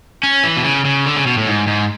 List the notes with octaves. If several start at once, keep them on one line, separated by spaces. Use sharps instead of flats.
C#4
E3
B2
C#3
C#3
D3
C#3
B2
A2
G#2
G#2